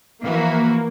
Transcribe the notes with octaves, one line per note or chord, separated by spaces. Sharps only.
E3 F3 A#3 F#4